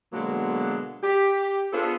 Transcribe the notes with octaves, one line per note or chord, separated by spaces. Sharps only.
B2 D3 F#3 G#3 A#3 B3
G4
B3 D4 F4 G#4 A4 C5